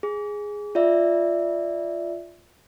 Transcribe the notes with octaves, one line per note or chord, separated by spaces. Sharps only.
G#4
F4 D5 E5